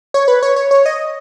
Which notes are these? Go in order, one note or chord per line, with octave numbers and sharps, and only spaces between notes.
C#5
B4
C#5
C#5
C#5
D#5